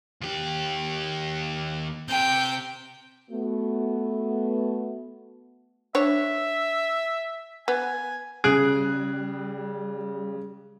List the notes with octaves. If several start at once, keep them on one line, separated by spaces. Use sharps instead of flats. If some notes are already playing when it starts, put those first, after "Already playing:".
D#2 G4
C3 G5
A3 B3 F#4
D4 C#5 E5
B3 G#5
C#3 G3 G#4 F#6 D7